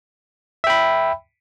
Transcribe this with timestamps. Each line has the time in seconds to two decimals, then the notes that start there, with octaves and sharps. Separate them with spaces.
0.64 E5
0.67 G5
0.70 B5